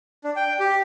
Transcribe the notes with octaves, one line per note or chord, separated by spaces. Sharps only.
D4
G5
G4